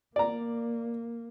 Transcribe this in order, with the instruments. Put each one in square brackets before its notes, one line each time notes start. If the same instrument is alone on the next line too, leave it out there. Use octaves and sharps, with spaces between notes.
[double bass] A#3 [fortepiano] D5 A#5